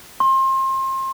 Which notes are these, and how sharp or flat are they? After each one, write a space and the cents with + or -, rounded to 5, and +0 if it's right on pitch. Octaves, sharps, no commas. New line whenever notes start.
C6 +30